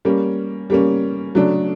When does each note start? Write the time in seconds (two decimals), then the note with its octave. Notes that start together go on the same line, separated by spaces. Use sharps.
0.05 G3 A#3 C#4
0.70 G3 A#3 C#4
1.35 C#3 F#3 A3 D4